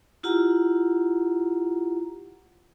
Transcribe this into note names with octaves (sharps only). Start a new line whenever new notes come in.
E4 F4 G4 F#5 A#5